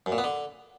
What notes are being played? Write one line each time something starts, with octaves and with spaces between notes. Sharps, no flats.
F#2
A#2
B3
D3